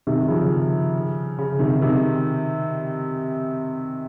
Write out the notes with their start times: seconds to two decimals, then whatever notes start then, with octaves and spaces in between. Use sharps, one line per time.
0.07 C3 D#3
0.28 C#3 F3
1.38 C#3
1.59 C3 D#3
1.81 C3 D#3